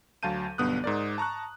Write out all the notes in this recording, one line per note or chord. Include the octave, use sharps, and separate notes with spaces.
D2 F#3 F5 A5 G6 D#7
B1 G2 D3 B3 D#6 F#6
G#2 A#4 D5
A5 A#5 C#6 F#6